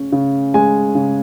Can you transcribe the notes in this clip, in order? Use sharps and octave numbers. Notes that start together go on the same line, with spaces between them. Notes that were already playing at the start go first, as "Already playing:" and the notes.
Already playing: C#3 C#4
C#3
G#3 G#5
C#3